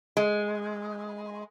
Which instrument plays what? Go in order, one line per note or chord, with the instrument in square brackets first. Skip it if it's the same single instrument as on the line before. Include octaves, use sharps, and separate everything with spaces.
[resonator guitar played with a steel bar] G#3